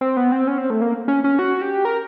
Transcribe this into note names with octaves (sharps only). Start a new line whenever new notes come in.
C4
B3
C4
C#4
C4
A3
A#3
C#4
C#4
F#4
G4
A#4